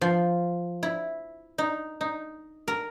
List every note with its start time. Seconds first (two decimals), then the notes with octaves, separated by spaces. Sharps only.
0.01 F3
0.83 E4
1.58 D#4
2.01 D#4
2.68 A#4